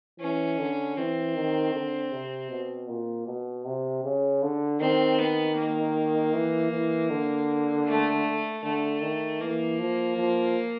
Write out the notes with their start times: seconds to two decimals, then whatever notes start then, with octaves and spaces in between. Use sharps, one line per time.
0.20 E3 C#4
0.59 D3
0.97 E3 C4
1.36 D#3
1.74 D3
2.12 C3
2.50 B2
2.88 A#2
3.26 B2
3.65 C3
4.04 C#3
4.43 D3
4.80 D#3 C4
5.19 B3
5.57 A#3
6.34 E3
6.72 E3
7.10 D3
7.87 A3
8.63 D3 A3
9.01 D#3
9.40 E3 A#3
9.79 F3
10.17 F3